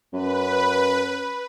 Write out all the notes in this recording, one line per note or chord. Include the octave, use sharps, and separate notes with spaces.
F#2 B4